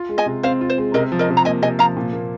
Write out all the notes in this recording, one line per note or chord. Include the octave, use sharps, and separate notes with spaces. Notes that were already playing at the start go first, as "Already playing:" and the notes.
Already playing: F4
G#3
D#5 G#5
C3
C4 C5 F5
F4
C5
G#3
C3 A#4 D#5
F3
A#4 D#5
C3
A#5
A#3 D#5 G#5
C3 D#5 G#5
F3 F5 A#5
A#2
A#3